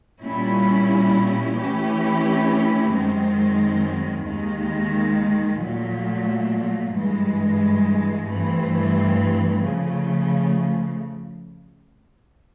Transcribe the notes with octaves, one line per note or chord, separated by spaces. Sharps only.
A#2 G3 A#3 C#4 E4
E3 A3 C#4 E4 G4
F#2 D#3 G#3 C4
D#2 D#3 G#3
A#2 F#3 A3
G2 E3 G#3
G2 E3 A3 C4
C#3 F3 A3